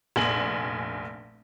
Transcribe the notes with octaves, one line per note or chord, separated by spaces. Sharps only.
F1 A#1 G#5 F#7